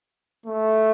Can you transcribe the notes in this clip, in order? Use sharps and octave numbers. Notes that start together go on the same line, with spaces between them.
A3